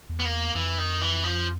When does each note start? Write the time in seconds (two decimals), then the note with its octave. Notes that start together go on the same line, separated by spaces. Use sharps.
0.09 E2
0.20 B3
0.25 A#3
0.55 F2 E3
0.78 D#3
1.01 E3
1.24 F3